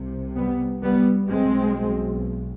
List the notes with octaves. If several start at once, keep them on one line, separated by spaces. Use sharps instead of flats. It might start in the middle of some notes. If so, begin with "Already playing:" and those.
Already playing: C2 C3
G3 B3
G3 B3
B1 B2 G#3 C4